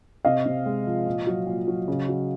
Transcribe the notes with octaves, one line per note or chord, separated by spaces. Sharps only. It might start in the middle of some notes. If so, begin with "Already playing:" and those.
C3 D#5 F5
C3
G#3
F3
A#2
F#3
A#2
F#3
C#3
F#3